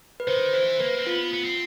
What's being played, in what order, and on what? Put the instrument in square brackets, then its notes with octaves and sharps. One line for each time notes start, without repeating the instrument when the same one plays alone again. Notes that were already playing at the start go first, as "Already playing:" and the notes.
[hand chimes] B4
[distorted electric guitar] D#3 [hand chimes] C5
[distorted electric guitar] E3 [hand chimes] C5
[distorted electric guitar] A#3 [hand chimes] B4
[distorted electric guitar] C4
[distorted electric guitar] B3 [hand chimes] F4
[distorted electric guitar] B3
C4